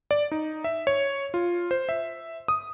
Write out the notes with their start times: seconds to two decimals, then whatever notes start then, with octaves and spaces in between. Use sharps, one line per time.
0.11 D5
0.32 D#4
0.64 E5
0.87 C#5
1.34 F4
1.71 C5
1.89 E5
2.48 D#6